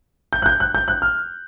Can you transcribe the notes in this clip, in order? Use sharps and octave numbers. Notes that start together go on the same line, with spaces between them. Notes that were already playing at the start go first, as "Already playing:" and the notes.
G6
F#6
G6
F#6
G6
F#6
F6